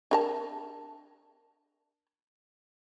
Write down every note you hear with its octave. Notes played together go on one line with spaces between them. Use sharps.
D4 A#4 A5